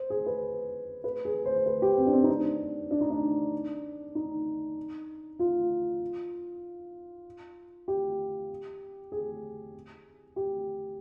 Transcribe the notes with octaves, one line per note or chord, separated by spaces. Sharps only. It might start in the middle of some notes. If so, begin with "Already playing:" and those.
Already playing: C5
G#4
B4
B4
G#4
C5
C5
B4
G4
C4
D4
C4
D#4
D4
D4
D#4
D4
D#4
F4
G4
G#4
G4